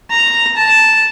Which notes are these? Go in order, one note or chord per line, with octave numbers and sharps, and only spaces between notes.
A#5
A5